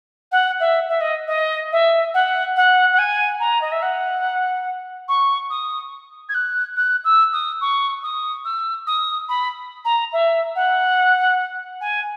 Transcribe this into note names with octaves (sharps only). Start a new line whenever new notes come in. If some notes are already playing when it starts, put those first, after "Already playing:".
F#5
E5
E5
D#5
D#5
E5
F#5
F#5
F#5
G#5
A#5
D#5
E5
F#5
C#6
D#6
G#6
F#6
F#6
E6
D#6
C#6
D#6
E6
D#6
B5
A#5
E5
F#5
G#5